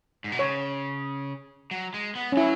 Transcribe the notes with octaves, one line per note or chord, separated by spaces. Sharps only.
G#2
B2
C#3 C#5
F#3
G#3
B3
C#4
F#3 E4